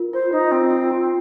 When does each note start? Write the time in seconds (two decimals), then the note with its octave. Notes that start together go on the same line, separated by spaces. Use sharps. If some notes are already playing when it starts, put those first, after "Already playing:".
Already playing: F4 A#4
0.13 F4 C5
0.32 D#4 F4
0.51 C4 F4
0.70 F4
0.90 F4